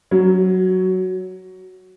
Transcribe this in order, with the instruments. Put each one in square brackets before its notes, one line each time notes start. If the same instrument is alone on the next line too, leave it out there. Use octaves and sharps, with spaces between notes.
[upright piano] F#3